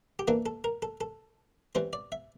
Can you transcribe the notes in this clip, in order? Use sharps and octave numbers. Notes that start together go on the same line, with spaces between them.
G4
E3 A#3 D4 A4
A4
A#4
A4
A4
E3 G3 C4 C5
D5
E5